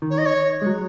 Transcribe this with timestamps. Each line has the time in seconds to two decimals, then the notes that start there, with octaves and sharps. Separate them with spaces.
0.02 D#3
0.10 C#5
0.18 D#5
0.26 C#5
0.62 G#3
0.67 F#3